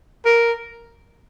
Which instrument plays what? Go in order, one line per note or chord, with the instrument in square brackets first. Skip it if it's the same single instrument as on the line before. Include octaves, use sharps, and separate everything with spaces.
[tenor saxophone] A#4